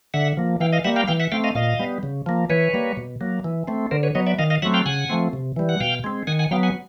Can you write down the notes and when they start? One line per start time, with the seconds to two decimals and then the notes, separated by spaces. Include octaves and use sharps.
0.14 D3 E5 F#5
0.37 F3 A#3
0.60 E3 F5 G5
0.73 D#5 F5
0.84 G3 A#3 E5 F#5
0.96 F5 G5
1.08 E3 F5 G5
1.20 E5 F#5
1.32 A3 C4 F5 G5
1.44 D#5 F5
1.55 A#2 D#5 F5
1.79 G3 B3
2.03 C#3
2.26 F3 A#3
2.50 E3 B4 C#5
2.74 G3 A#3
2.97 B2
3.21 F#3 A#3
3.44 E3
3.68 A3 C4
3.91 D3 A#4 C5
4.03 B4 C#5
4.15 F#3 B3 C#5 D#5
4.27 D5 E5
4.39 D#3 D#5 F5
4.50 D#5 F5
4.62 F#3 A3 C4 E5 F#5
4.74 F5 G5
4.86 C#3 F#5 G#5
5.10 F3 A3 C4
5.33 C3
5.56 E3 G3
5.69 F#5
5.80 B2 F5 G5
6.04 G#3 C4
6.27 D#3 F#5 G#5
6.39 F#5 G#5
6.51 F#3 B3 F5 G5
6.63 F#5 G#5